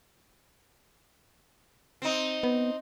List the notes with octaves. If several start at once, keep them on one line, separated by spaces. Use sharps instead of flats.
C4 D#4
B3